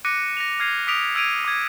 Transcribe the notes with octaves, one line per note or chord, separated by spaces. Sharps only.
D6 F#6 A#6 C#7 D#7
A#6 F7
F6 G#6 C7 D#7 F7
D6 D#6 B6 D7 F7
E6 G#6 D7 D#7 F7
D6 G#6